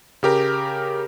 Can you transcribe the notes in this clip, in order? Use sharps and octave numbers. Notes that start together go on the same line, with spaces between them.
C#3 G4 A#4